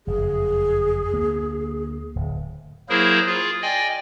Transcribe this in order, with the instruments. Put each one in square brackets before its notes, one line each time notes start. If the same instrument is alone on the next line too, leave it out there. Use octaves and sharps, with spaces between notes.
[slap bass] F#1 F2 [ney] G#4
[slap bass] D2 A#3
D1
[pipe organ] F#3 A#3 E4 G#4 A#4 C5
F4 G#4
D5 D#5 G5 G#5